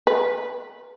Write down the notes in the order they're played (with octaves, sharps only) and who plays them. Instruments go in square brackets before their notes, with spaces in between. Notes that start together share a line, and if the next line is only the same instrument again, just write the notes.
[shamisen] B4